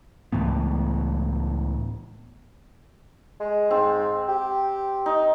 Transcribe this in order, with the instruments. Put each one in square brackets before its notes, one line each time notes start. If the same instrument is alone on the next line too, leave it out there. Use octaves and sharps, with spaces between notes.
[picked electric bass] C#2 A2 E3 B3
[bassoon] G#3
[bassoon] G#2 [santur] C4
[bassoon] G4
[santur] D#4